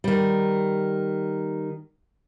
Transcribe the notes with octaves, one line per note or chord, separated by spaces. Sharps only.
D#3 G3